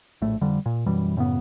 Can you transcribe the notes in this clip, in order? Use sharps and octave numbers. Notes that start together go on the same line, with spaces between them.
A#1 A2 A3
F2 D3 G3
A#2
F#2 B2 E3 G3
F#2 A2 C#3 B3